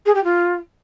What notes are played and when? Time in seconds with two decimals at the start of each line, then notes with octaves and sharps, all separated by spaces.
0.06 G#4
0.15 G4
0.24 F4